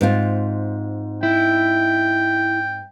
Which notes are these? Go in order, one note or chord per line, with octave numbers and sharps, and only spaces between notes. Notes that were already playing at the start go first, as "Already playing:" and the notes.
G#2 C4 F4
E4 G5